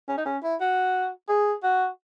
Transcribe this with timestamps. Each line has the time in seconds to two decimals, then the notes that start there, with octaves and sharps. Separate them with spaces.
0.09 C#4
0.18 D#4
0.26 C#4
0.43 E4
0.61 F#4
1.29 G#4
1.63 F#4